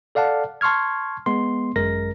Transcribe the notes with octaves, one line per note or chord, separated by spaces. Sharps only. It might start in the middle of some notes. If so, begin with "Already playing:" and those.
A4 D5 F5 F#5 A5
A5 C6 C#6 F6 G#6
G#3 B3 C6
G#1 F#2 G#3 A#4 A#6